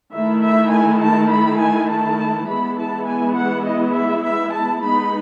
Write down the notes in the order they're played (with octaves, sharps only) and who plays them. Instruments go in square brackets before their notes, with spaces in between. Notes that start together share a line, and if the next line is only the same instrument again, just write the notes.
[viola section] D#3 A3 E4 E5
E5
G#5
A5
B5
G#5
A5
E3 G#3 B3 E4 B5
A5
G#5
F#5
D#5
E5
E5
A5
G#3 B3 D#4 B5